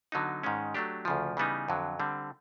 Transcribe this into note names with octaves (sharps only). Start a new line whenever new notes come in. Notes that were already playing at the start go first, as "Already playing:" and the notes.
D3 F#3 B3 D#4
G#2 D#3 G#3 C#4
F#3 A3 D4 G4
D2 C#3 F3
C#3 E3 G3 B3 D#4
F2 D3 F#3
D3 G3 C4